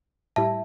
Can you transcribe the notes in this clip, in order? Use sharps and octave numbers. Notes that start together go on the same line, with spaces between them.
A2 G3 E4 E5 A5